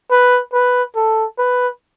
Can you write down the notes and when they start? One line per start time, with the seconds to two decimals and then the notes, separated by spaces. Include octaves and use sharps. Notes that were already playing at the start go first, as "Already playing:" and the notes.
0.11 B4
0.53 B4
0.96 A4
1.38 B4